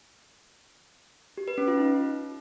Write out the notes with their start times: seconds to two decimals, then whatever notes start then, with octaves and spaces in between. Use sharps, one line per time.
1.37 G4
1.48 B4
1.58 C#4
1.68 F4
1.78 D#4